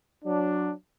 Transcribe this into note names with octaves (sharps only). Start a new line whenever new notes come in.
F#3 D4